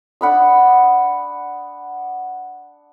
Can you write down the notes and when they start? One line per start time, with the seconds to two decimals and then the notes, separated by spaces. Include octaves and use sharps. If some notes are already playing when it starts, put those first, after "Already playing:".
0.21 D4 F#5 B5 D#6